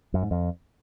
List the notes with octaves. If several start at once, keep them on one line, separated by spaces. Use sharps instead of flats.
F#2
G#2
F2